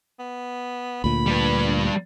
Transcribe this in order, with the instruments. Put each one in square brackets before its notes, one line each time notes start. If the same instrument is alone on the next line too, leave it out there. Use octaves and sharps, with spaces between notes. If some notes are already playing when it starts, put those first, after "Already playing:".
[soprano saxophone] B3
[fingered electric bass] D2 A#2 [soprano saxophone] B5
[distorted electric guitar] G3 B4